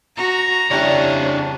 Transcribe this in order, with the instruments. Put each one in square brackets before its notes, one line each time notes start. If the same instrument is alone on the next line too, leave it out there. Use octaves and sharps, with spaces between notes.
[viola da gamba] F#4 [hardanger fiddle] A#5
[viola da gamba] F2 C#3 [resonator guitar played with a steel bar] G3 E4 G4 [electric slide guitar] D4 C#5